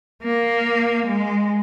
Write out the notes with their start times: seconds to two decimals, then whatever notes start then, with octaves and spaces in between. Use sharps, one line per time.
0.23 A#3
1.06 G#3